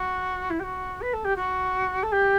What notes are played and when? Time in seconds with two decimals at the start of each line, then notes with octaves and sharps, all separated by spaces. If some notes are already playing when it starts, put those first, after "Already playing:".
Already playing: F#4
0.50 E4
0.59 G4
0.63 F#4
1.01 B4
1.13 A4
1.24 G4
1.36 F#4
2.03 A4
2.12 G4